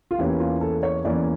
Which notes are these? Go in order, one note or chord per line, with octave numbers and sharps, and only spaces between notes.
F4
E2 E3 A#3 C#4 G4
F4
A4
C#5
E2 E3 A#3 C#4 D5